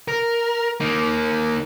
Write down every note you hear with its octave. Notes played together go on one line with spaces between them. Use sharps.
A#4
A#3 D#4